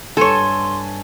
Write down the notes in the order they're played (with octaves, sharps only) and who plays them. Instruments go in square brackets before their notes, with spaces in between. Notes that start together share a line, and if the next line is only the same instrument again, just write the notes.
[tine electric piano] G2 G#5 A5 [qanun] A4 C#5 [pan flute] C6